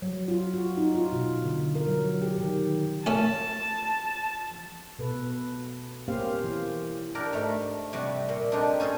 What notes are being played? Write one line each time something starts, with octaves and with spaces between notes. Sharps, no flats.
F#3
F4
F#4
D#4
F4
B2
D3
A#4
F#3
G4
D#3
A3 C#4 A5
B2 A4 B4
A#3 C#4 G4 C5 F5
E3
D4 G4 A#4 D5
G#2 A3
C3 G3 F#4
A#2
C4 D4 D#4 G4 A4 C5
C#4 G#4 A4 C5